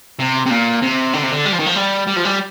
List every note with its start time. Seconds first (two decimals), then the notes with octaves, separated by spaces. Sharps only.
0.19 C3
0.46 C3
0.50 A#2
0.82 C3
1.13 D3
1.23 C3
1.32 D3
1.45 G3
1.53 F3
1.59 D#3
1.66 F3
1.75 G3
2.07 G3
2.16 F3
2.25 G3